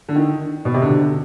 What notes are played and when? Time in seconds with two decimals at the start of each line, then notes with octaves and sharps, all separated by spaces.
0.09 D3
0.16 D#3
0.65 B2
0.74 C3
0.82 D3